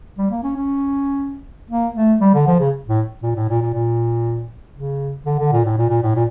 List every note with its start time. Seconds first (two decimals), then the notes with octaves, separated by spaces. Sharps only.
0.18 G3
0.31 A#3
0.43 C#4
0.56 C#4
1.70 A#3
1.95 A3
2.21 G3
2.34 D3
2.47 F3
2.60 C#3
2.89 A2
3.23 A#2
3.35 A2
3.49 A#2
3.62 A#2
3.73 A#2
4.76 C#3
5.26 D3
5.39 D3
5.52 A#2
5.65 A2
5.78 A#2
5.89 A#2
6.02 A2
6.15 A#2